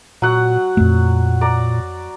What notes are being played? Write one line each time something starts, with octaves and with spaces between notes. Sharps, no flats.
A#2 F#3 F#5
F2 A#2 A3
D5 A#5